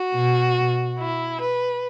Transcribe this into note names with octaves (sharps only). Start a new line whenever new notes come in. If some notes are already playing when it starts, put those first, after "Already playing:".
Already playing: F#4
B2
E4
B4